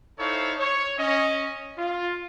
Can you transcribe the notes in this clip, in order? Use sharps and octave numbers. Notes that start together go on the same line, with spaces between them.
D#4 E4 A4 C5 C#5 F5
C#5
C#4 D#5
F4